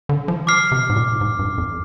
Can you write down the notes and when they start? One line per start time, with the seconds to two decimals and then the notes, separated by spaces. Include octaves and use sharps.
0.09 D3
0.28 F3
0.47 D6 F6 C7
0.72 C3
0.89 G#2
0.96 A#2
1.21 G#2
1.39 G2
1.58 F2